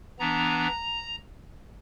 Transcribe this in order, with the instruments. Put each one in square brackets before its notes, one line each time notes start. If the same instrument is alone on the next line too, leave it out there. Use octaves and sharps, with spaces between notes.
[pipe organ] E3 B3 D4 A#5